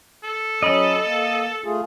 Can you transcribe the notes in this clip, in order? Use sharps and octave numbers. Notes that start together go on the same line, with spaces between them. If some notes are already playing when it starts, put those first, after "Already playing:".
A4
F#3 C#4 D#5 B5
A#3
A3 F4 G#4